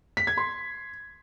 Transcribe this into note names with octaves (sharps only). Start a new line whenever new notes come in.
B6
G#6
C6